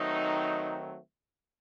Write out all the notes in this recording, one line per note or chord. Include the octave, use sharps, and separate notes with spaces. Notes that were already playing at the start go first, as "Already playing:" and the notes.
Already playing: D#3 F#3 A3 C4 D#4